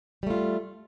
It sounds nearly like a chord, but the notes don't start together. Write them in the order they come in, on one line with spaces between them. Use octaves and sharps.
G3 A3 F4